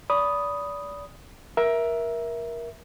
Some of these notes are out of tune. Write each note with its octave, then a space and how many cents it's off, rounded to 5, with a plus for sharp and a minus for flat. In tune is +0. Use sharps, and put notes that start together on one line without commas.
D5 -30 B5 +0 D#6 +0
A#4 +20 E5 +0